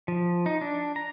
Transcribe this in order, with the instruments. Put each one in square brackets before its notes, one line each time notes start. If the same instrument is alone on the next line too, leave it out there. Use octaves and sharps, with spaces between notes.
[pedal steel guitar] F3
D#4
D4
A#5